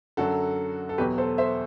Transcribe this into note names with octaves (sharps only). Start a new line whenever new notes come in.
F#2 D3 F#3 F#4 A4
A4
E2 B2 F#3 G4 B4
A4 C5
C5 E5